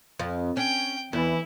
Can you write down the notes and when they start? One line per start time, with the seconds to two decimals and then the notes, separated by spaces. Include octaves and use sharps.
0.19 F2
0.57 C#4 G5
1.13 E2 E3 E4